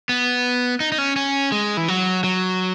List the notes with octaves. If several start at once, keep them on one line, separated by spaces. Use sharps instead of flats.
B3
D#4
D#4
C#4
C#4
G#3
E3
F#3
F#3